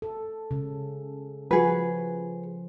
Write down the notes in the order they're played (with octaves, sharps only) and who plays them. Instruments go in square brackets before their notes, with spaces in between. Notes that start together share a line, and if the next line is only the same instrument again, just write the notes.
[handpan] A4
C#3
[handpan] F3 [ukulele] F#4 G#4 B4